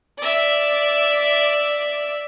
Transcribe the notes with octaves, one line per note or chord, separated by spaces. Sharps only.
D5 E5